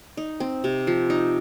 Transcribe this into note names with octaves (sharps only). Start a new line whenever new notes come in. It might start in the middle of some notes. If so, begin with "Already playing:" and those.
D#4
C4
C3
F3
D#4